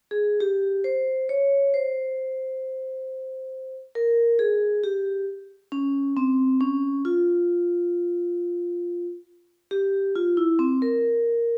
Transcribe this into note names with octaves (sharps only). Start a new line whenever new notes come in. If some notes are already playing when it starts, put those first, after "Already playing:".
G#4
G4
C5
C#5
C5
A#4
G#4
G4
C#4
C4
C#4
F4
G4
F4
E4
C4
A#4